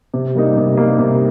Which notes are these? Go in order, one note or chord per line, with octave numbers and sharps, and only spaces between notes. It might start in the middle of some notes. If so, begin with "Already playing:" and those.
C3
G3 A#3 D#4
C3
G3 A#3 D#4
C3